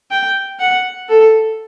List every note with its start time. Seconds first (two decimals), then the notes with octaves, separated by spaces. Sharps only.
0.11 G5
0.60 F#5
1.09 A4